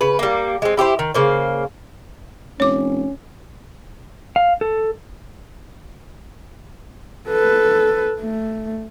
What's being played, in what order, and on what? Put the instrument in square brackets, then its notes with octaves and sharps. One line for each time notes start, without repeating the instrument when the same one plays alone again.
[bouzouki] C#3 B4
G3 A#3
G#3 C4
E4 G4 A4 C5
D#3
C#3 A#3 C5
[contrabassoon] F1 [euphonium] C#4 [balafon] C#5 D6
[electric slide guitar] F5
A4
[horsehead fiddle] A4 B4
A3